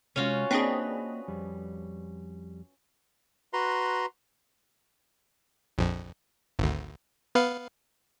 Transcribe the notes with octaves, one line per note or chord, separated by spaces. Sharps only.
C3 G#3 C#4 F4 F#4
A#3 C4 D4 G#4 B4 D#5
F2 G3
F#4 B4 A#5 C6
A#1 F2
G#1 D2
B3 B4 F5